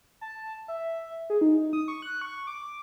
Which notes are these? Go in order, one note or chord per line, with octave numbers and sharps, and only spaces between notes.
A5
E5
G#4
D#4
D#4
D#6
C#6
F#6
C#6
D6